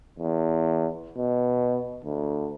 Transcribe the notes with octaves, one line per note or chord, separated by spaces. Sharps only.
E2
B2
D2